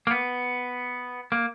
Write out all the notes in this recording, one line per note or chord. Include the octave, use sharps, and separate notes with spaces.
A#3
B3
A#3